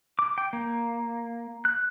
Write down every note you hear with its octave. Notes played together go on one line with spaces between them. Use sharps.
D6
G5
A#3
F#6